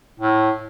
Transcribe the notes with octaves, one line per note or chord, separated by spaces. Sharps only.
A2